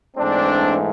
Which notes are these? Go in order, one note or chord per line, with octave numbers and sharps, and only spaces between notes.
G#2 E3 A3 C4 D4